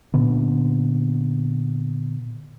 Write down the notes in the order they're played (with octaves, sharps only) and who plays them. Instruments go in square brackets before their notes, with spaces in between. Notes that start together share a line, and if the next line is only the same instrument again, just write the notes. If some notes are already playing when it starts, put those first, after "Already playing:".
[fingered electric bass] A#2 D3 B3